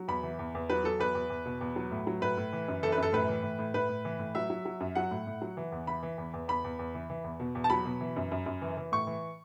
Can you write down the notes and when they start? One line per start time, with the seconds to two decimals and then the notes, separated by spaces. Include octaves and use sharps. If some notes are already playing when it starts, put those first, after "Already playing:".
Already playing: F#3
0.08 E2 B5
0.23 E3
0.39 E2
0.55 E2
0.70 F#3 B4
0.84 F#3 A4
0.99 E2 B4
1.15 E2
1.30 E2
1.46 B2
1.61 E2
1.76 F#3
1.91 A2
2.07 F#3
2.21 A2 B4
2.37 A2
2.53 E3
2.68 F#2
2.83 E3 A4
2.92 B4
2.98 F#2 A4
3.13 A2 B4
3.28 E3
3.43 A2
3.59 A2
3.74 A2 B4
3.89 A2
4.05 E3
4.19 A2
4.35 F#3 E5
4.50 F#3
4.65 F#3
4.80 F#2
4.95 F#3 F#5
5.11 A2
5.27 A2
5.42 F#3
5.57 E3
5.72 E2
5.87 E3 B5
6.03 E3
6.18 E2
6.34 E2
6.48 E2 B5
6.64 E2
6.79 E2
6.95 E3
7.10 E3
7.24 E2
7.40 B2
7.55 E2
7.64 A5
7.70 F#3 B5
7.85 B2
8.01 E3
8.16 F#2
8.31 F#2
8.46 F#2
8.62 E3
8.77 E3
8.92 A2 C#6
9.07 E3